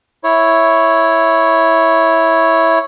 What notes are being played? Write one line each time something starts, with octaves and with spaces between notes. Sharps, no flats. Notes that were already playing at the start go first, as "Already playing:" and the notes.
E4 C#5